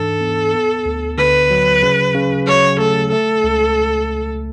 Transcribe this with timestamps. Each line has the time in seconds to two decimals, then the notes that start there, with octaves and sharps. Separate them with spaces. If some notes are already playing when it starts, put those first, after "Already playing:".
Already playing: G#2 E3 D4 A4
0.21 B3
0.53 B3
0.86 D2
1.18 D3 B4
1.50 F#3
1.83 C#3
2.15 C#3
2.47 F#3 C#5
2.79 A3 A4
3.12 A3 A4
3.44 C#2